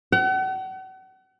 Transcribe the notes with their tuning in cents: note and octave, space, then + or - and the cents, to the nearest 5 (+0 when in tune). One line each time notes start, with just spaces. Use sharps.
F#5 +40